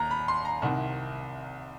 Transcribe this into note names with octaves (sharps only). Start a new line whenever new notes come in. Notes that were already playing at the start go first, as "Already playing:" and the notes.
Already playing: D#2 A#5
B5
C6
A#5
C2 C3 D#3 F#5